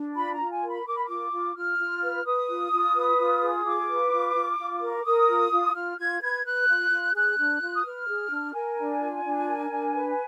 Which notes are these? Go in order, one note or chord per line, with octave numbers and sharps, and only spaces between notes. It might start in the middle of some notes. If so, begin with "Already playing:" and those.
Already playing: D4
F4 B5
A#5
F4
G#5
A#4
B5
A#4 D6
B5
F4 D6
F4
F4 F6
F4
B4
B4 D#6
F4
F4
B4
F4
G#4
F4 D6
B4
F4
F4
F4
A#4
A#4 D#6
F4
F4
F4 F6
F4 G#6
B4 G#6
B4 F#6
F4
F4
G#4 F#6
D4
F4
D#6
B4 F6
G#4
D4
A#4 G#5
D4
F4
D4
A#4
D4
B4